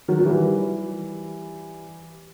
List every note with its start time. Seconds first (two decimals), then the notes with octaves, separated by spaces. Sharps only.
0.08 D#3 F#3
0.20 F#3
0.25 E3 G3